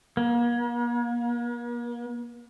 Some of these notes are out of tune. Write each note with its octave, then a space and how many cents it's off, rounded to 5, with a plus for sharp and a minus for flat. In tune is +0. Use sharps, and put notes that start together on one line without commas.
A#3 +40